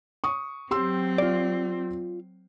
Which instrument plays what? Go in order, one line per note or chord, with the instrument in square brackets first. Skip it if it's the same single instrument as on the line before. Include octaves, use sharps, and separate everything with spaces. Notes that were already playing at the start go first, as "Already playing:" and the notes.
[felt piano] C#6 D#6
[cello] F#3 C4 [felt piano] G4 C6 E6
[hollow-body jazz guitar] F4 D5